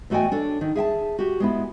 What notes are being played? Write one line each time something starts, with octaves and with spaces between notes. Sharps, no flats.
E2 A3 F#4 D#5 G5 G#5
D4 A4 C#5
D#3
G#4 E5 G5 A5
F#4 G4
G#3 B3 E4